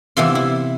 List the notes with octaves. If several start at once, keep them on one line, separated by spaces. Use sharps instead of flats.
C3 E3 B3 E4 F4
E4